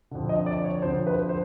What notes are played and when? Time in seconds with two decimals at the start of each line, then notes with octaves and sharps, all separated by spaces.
0.11 F2 D3
0.29 D#5
0.46 D5
0.64 C#5
0.82 F2 D3 C5
1.07 B4
1.29 C5